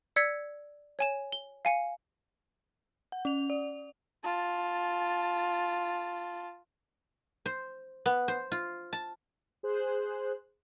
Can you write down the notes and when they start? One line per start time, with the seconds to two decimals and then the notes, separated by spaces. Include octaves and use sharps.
0.16 D5 E6 G#6 B6 C#7
0.99 C#5 G#5 E7
1.32 G7
1.65 F5 G#5 C#7
3.12 F#5
3.25 C#4 F7
3.50 D5
4.23 F4 A5
7.46 C5
8.06 B3
8.28 C5
8.52 F4
8.93 A5
9.63 G#4 C5 F#6